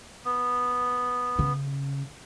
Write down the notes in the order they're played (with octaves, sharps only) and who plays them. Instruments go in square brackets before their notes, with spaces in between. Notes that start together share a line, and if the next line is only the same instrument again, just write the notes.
[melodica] B3
[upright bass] C#3